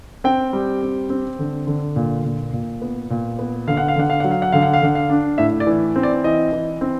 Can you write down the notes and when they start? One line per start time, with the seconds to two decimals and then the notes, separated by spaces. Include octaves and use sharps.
0.24 C4 G5
0.53 G3
0.82 C4
1.10 C4
1.39 D3
1.67 D3
1.96 A#2
2.24 A#2
2.53 A#2
2.82 B3
3.10 A#2
3.39 B3
3.67 D3 F5
3.77 F#5
3.88 F5
3.96 D3 F#5
4.10 F5
4.20 F#3 F#5
4.31 F5
4.42 F#5
4.52 D3 F5
4.63 F#5
4.73 F5
4.82 D3 F#5
4.95 F5
5.10 D4
5.38 A2 E5
5.60 D5
5.67 E3
5.96 C4
6.03 D5
6.24 E3 D#5
6.53 E3
6.81 C4